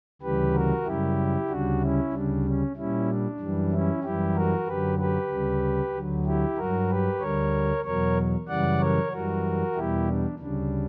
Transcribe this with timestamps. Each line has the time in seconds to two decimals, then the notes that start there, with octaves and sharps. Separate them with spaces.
0.22 D2 C#3 E3 G3 G4 B4
0.54 F#4 A#4
0.85 F#2 C#3 G3 E4 G4
1.49 D2 C#3 G3 D4 F#4
1.81 C#4 E4
2.12 D2 C#3 G3 D4
2.45 C#4
2.76 A#2 G3 C#4 E4
3.07 D4
3.40 F#2 E3 G3
3.72 C#4 E4
4.03 F#2 E3 G3 E4 G4
4.35 F#4 A#4
4.67 F#2 D3 F#3 G4 B4
4.98 G4 B4
5.30 D2 C#3 G3
5.94 D2 D3 F#3
6.25 E4 G4
6.57 G2 F#3 F#4 A#4
6.89 G4 B4
7.20 D2 D3 G3 A#4 C#5
7.85 E2 B2 F#3 A#4 C#5
8.48 F#2 C#3 E3 G3 D5 F#5
8.80 A#4 C#5
9.12 F#2 E3 G3 F#4 A#4
9.75 E2 B2 G3 E4 G4
10.07 D4
10.39 D2 C#3 G3 D4